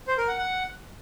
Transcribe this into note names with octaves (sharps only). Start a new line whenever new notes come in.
C5
A#4
F#5
F#5